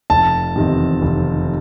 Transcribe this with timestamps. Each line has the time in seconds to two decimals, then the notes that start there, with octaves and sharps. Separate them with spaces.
0.10 F1 A5
0.56 E2 C3 D#3
1.02 F1